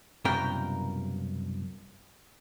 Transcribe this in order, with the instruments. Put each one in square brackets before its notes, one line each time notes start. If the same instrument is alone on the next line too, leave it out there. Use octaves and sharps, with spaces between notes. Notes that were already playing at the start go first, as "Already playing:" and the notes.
[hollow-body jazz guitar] C2 F#2 B2 A#3 A#4 G5